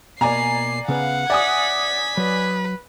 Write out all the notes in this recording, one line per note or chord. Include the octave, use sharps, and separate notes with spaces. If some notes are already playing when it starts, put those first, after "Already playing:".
B2 A#3 D5 G#5 A#5 C7
C#3 B3 B4 F5 F#5
D5 E5 G#5 D#6 G#6 B6
F#3 B4